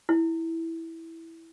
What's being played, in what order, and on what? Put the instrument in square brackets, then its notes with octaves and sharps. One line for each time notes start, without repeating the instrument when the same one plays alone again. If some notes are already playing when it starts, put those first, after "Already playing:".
[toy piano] E4